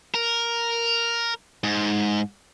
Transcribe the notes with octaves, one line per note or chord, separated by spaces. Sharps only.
A#4
G#2